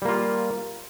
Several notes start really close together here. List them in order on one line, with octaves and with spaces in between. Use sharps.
G3 A#3 F4